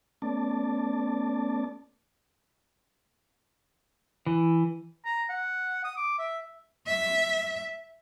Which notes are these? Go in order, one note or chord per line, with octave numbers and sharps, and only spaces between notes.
A3 B3 C#4 D5 A5
E3
A#5
F#5
D#6
D6
E5
E5